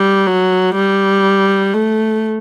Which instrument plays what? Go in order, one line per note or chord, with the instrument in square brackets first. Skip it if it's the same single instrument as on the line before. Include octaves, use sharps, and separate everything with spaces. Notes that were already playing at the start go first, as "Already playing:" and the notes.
Already playing: [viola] G3
F#3
G3
A3